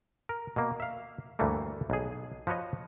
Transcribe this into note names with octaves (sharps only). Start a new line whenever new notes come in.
A#4
B2 A#3
E5 F5
D2 G2 E3 G3 A3 A#3
B1 G#4
F3 F#4 B4 C#5 D#5